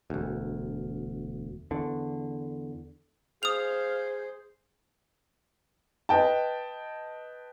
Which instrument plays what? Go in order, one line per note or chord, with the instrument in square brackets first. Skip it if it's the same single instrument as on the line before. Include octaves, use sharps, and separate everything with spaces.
[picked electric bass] E1 D2
E2 D3
[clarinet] G#4 [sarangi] C5 [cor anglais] F5 [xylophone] D#6 F7
[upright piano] B4 D#5 G5 A5